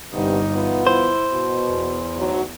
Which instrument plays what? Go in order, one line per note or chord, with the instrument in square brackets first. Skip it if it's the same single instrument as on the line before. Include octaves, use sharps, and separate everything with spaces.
[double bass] G1 D#4 [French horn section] G2 C3 B3
[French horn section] E3 B3 F4
[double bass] E4 [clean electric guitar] C5
[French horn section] B2
[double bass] E2
[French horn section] D2 F#3 D#4